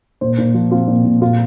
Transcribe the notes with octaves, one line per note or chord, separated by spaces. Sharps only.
A#2 C5
A#2
F3
C4 F4
A#2
A#2
A#2 F4